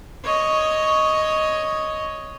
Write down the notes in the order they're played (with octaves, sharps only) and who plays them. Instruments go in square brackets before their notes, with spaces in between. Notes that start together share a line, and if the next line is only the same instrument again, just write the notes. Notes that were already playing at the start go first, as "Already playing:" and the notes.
[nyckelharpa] C#5 D#5